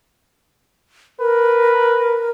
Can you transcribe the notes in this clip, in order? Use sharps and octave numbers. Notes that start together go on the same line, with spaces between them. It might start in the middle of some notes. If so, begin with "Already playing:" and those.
A#4 B4